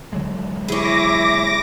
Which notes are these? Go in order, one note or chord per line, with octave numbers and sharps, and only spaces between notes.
D3 F#3 G#3
E4 G#4 C#5 D6 A#6